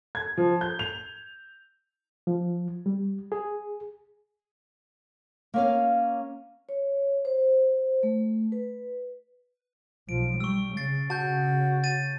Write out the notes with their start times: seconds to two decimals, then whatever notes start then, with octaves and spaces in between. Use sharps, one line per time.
0.15 G#6
0.38 F3
0.61 G6
0.79 F7
2.27 F3
2.86 G3
3.32 G#4
5.54 A#3 C#4 F5
6.69 C#5
7.25 C5
8.03 A3
8.52 B4
10.09 B1 F3 D7
10.40 G3 C#6 E6
10.77 C#3 A6 C7
11.10 F#4 A5 G6
11.84 A6 D#7